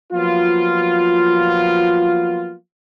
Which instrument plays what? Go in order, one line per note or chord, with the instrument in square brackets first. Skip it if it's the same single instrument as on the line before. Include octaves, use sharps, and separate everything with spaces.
[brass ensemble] F3 F#3 A#3 B3 F4